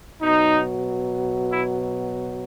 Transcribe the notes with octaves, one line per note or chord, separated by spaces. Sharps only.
B2 F#3 D#4
E4